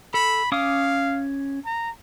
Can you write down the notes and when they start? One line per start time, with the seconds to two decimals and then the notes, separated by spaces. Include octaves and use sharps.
0.14 A4 B5
0.52 C#4 F5 D6 D#6
1.66 A#5